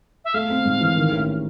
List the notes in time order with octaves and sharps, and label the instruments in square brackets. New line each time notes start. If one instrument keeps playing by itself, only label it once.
[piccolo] E5
[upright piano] A3 [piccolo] F5
[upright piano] C4
G#2
E3
D#3
A1